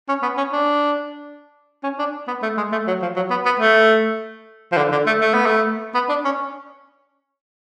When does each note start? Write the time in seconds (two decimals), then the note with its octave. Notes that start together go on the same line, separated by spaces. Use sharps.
0.08 C#4
0.22 B3
0.37 C#4
0.52 D4
1.83 C#4
1.99 D4
2.28 B3
2.43 A3
2.57 G#3
2.72 A3
2.87 F#3
3.02 F3
3.16 F#3
3.30 B3
3.45 B3
3.60 A3
4.72 F3
4.77 D3
4.92 D3
5.07 A3
5.21 A3
5.34 B3
5.46 A3
5.94 B3
6.09 D4
6.25 C#4